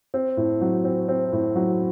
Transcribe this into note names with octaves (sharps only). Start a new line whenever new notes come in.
C4
A2
F#3
C4
C4
A2
F#3